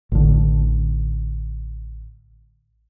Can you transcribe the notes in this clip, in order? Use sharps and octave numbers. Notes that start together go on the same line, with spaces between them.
A1 D3